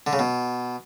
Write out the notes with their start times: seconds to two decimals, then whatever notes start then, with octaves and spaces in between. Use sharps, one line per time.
0.07 D3
0.13 C#3
0.19 B2